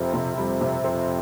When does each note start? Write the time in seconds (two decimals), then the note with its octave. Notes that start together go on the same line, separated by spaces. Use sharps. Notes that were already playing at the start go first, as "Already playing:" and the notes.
Already playing: F2 C3 G3 C4
0.14 C3
0.37 F2 G3
0.61 C3
0.84 F2 C4